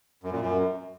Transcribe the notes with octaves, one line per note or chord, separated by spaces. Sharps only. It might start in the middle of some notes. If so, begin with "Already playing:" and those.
F#2
A#2
F#2